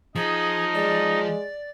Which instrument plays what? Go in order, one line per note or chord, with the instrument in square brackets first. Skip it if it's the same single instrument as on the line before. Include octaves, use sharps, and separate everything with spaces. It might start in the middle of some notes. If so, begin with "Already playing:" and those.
[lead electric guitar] F3 [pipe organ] D#4 [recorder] G#4
[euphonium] G#3 [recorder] D5